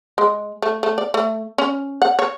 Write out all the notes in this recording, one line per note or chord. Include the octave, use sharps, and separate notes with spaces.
G#3
A3
A3
D5
A3
C#4
F#5
C#5